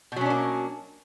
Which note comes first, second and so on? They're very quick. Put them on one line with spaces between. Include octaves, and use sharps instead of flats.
B2 F#3 C#4 D4 A#3